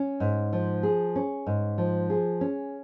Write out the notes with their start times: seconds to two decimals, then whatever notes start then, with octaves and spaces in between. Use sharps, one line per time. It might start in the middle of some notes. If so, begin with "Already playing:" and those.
Already playing: C#4
0.20 G#2
0.53 F3
0.83 G#4
1.16 C#4
1.47 G#2
1.78 F3
2.10 G#4
2.41 C#4